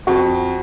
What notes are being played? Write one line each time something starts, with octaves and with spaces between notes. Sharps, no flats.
F2 F#4